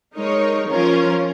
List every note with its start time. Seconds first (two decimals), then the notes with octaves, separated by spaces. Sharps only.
0.15 G#3 D#4 A#4 C#5
0.68 F3 C#4 F4 A#4